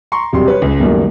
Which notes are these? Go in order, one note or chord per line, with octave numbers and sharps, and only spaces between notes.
A#5 C6 C#6
E1 C3 F#3 G3 G4 C6
B4 C#5
C#2
F#2 B2 D#3 G3 A3 A#3